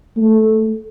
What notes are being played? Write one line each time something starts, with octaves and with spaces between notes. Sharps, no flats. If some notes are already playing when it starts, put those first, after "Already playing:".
A3